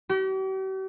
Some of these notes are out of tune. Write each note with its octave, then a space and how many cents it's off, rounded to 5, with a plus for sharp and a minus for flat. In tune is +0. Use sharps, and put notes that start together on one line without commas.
G4 -45